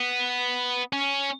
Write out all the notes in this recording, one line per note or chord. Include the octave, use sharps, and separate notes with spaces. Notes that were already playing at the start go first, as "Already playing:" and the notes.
Already playing: B3
C#4